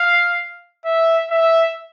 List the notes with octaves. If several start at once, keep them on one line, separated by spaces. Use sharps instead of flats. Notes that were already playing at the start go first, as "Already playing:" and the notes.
Already playing: F5
E5
E5